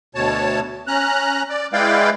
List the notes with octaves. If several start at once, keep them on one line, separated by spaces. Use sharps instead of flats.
D2 B2 C#5 A5
C#4 A#5 F#6
D5
G#3 E4 B4 D5 F5 G5